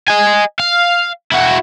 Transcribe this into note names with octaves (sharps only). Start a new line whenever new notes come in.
D#5 G#5
F5
E4 F#4